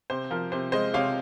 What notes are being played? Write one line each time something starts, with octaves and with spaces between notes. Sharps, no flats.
C3 C5
F3 A#4
C3 C5
G#3 C5 D#5
C3 C#5 F5